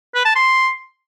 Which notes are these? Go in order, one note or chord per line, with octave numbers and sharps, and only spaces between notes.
B4
A5
C6